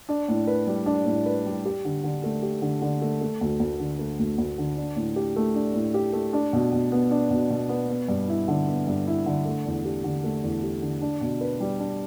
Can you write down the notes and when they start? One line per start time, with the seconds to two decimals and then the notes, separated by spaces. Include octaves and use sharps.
0.09 D4
0.28 A2
0.47 B4
0.67 G3
0.86 D4
1.06 A2
1.26 B4
1.46 G3
1.65 G4
1.85 D3
2.04 D3
2.24 A3
2.42 G4
2.62 D3
2.82 D3
3.02 A3
3.21 A3
3.41 D2
3.60 D2
3.79 D3
3.99 A3
4.19 D2
4.38 D2
4.58 D3
4.77 D4
4.96 A2
5.16 G4
5.36 A3
5.55 D4
5.74 A2
5.94 G4
6.13 A3
6.33 D4
6.53 B2
6.73 B2
6.92 B3
7.11 D4
7.31 B2
7.50 B2
7.69 B3
7.89 B3
8.08 G2
8.29 E4
8.48 D3
8.68 B3
8.87 G2
9.07 E4
9.26 D3
9.46 A3
9.66 E2
9.85 G4
10.04 D3
10.24 A3
10.43 E2
10.63 G4
10.82 D3
11.02 D4
11.21 B2
11.41 B4
11.60 G3
11.79 D4